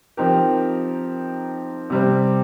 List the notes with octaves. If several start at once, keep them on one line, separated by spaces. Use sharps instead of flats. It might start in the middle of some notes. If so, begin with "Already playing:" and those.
F3 C4 D#4 G4 A#4
C3 G3 C4